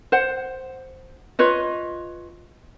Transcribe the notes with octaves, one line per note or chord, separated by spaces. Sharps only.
C5 F#5
F4 B4 C#5 D#5